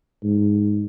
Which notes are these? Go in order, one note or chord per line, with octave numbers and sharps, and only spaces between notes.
G#2